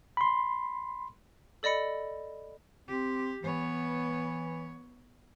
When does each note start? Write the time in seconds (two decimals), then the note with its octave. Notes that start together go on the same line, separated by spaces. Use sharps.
0.17 B5 C6
1.63 A4 D5 D#5 B5 C#7
2.88 C4 G4
3.43 E3 B3 C#5